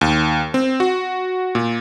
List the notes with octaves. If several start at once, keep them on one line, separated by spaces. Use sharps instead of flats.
D#2
C4
F#4
A#2